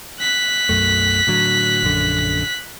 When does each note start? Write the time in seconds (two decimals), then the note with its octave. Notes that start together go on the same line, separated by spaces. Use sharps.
0.20 F#6 B6
0.69 B1 F#2 A3
1.27 A2 D3 F#3
1.83 A#1 F#2 D3